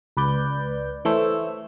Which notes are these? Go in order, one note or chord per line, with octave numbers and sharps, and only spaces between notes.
C#2 B4 D5 G6
E3 A3 C5 C#5 E6